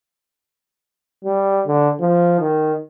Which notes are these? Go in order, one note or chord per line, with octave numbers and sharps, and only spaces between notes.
G3
D3
F3
D#3